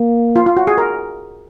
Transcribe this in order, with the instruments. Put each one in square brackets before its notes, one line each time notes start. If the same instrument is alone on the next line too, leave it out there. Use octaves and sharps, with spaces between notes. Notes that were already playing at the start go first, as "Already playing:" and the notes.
Already playing: [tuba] A#3
[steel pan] F4
F4
F#4
G#4
A#4